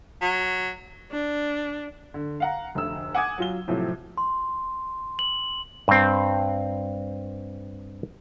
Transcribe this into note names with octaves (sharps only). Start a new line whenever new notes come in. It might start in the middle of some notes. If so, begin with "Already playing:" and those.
F#3
D4
D3
F5 F#5 A#5
F1 D2 E6
F#5 G#5 D6 D#6 G#6
F#3 F4 G7
A2 C3 F3 F#3
C6
F#7
G2 C4